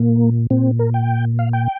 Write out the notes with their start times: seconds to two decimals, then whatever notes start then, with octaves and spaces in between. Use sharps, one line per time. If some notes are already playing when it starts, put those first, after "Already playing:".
Already playing: A#2 A#3
0.50 A#2 C4
0.79 A#4
0.94 G5
1.39 F5
1.53 G5